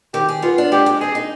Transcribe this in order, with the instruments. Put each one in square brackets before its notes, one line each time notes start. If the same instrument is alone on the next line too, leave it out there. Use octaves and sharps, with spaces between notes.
[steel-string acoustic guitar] D#3 [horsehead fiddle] G4
[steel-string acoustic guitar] G#4
[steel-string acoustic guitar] B3 [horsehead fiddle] F4
[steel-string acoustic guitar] D4
[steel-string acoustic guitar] G#3 [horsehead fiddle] G4
[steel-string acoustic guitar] G#3
[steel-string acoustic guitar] C4 [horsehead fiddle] G#4
[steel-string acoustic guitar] D#4